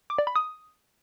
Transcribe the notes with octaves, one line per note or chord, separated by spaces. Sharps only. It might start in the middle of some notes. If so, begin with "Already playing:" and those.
D6
D5
B5
D#6